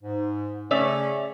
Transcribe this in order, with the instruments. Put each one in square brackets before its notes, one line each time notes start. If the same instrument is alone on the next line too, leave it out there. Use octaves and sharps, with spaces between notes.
[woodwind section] G#2
[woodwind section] C#3 A3 C#4 [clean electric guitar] C#5 D5 E5